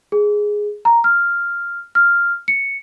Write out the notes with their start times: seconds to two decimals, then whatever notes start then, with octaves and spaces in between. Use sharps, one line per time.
0.12 G#4
0.85 A#5
1.04 F6
1.95 F6
2.48 C#7